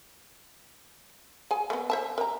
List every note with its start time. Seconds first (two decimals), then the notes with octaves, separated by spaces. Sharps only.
1.51 G#4 G#5
1.70 A3 B3
1.90 C5 E5 A5
2.18 A#4 A#5